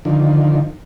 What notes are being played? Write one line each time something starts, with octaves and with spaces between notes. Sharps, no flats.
D3 D#3 F3